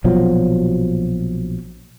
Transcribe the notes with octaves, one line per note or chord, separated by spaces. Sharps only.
A#1 B2 F3 F#3